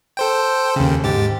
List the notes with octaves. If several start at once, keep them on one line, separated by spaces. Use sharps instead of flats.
A4 C5 G5
D#2 C#3
G#2 G4 A6